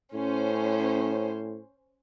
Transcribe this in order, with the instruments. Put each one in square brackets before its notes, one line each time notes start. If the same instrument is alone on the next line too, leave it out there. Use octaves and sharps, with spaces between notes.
[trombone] A2 [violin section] C#4 C5